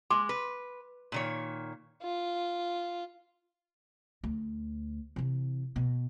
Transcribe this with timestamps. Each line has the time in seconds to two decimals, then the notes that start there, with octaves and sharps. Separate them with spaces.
0.10 G#3 C6 D6
0.29 B4
1.12 A#2 D#3 C#5
2.03 F4
4.24 D2
5.16 C3 E3
5.76 B2